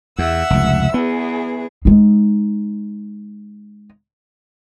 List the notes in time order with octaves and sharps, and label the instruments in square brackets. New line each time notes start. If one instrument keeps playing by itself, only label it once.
[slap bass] E2 [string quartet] E5 F#5 E6
[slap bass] F1 C#2
[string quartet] E2 G#4 [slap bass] B3
[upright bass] G#3 D#4